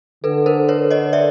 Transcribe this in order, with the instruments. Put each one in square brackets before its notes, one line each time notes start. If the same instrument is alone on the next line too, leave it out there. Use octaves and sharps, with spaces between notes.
[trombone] D3 [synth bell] A4 B4
[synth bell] A#4 C5
B4 C#5
C#5 D#5
D5 E5